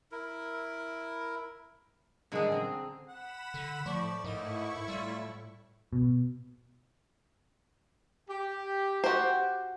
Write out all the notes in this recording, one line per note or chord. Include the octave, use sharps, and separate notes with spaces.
E4 A#4
A#2 D3 E3 G#3 G#4
C4 A#5
F#5 B5 E7
D3
A2 F3 D5 C#6
G#2 A#3 D#4 E4 C#6
G3 F4 E5
B2
G4
F#4 C5